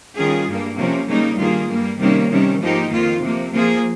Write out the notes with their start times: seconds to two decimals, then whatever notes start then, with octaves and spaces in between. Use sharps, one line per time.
0.17 D#3 G3 C#4 F4 G#4
0.47 G2 G3 A#3
0.78 C3 F3 A#3 C#4
1.08 C#3 G3 A#3 D#4
1.38 G2 D#3 A#3 F4 G#4
1.70 G2 G3 A#3
2.00 C3 D#3 G3 A#3 C#4
2.30 C3 D#3 G3 C#4
2.61 G#2 F3 A#3 D#4 G4
2.91 F2 D#3 A#3 F4
3.22 C3 F3 A#3
3.52 F3 A#3 F4 G#4